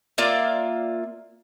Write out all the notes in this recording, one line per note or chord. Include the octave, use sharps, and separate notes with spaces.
A#3 F4 D5 E5